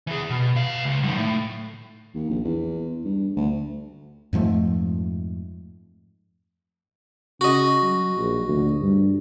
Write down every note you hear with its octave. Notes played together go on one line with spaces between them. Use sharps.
E3 G#4
B2
B2 F5
C#2
F#2 D#3
A2
D#2
A#1
E2
G2
D2
F2 G#2 F3 A3
C#3 F#4 D#5
F#3
A#1
D2
G2